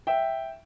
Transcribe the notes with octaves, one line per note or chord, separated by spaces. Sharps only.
E5 G5